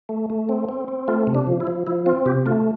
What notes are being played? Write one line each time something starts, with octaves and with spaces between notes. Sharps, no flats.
A3
A3
C4
C4
C4
A3 F4
C3
D4
F3
E4
F3
F3 E4
C4 F4
C3 G4
A3 F4